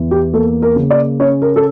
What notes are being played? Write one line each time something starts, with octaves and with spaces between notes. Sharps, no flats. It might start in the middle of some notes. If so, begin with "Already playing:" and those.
Already playing: E2 E3
G4
A#3 A4
A#4
C#3
D5
C#4 C#5
A#4
A4